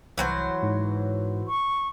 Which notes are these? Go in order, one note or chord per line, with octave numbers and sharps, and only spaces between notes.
C2 E3 F#3 C5
G#2
C#6